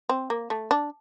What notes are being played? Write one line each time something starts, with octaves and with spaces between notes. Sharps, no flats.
C4
A#3
A3
D4